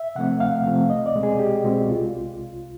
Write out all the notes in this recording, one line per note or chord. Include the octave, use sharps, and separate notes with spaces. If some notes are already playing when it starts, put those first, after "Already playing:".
Already playing: E5
C3 F3 A3 C4 F#5
D2 F5
C3 F3 A3 C4
C2 D#5
D5
B2 G#3 C4
G#4
C2 G4
B2 G#3 C4 F#4
C2 F4